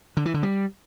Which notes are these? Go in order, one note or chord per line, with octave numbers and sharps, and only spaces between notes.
D3
E3
D3
G3